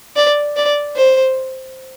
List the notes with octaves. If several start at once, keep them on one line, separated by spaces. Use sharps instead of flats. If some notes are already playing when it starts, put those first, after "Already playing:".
D5
D5
C5